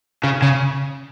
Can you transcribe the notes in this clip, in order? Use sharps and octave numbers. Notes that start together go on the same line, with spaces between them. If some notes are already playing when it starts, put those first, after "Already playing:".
C#3
C#3